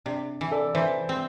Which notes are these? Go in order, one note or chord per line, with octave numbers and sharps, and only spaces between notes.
C3 D4
E3
A4 D5
E3 C5 E5
C4